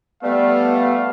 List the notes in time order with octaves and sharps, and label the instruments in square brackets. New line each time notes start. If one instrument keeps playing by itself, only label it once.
[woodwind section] G3 A3 [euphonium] B3 [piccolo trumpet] F5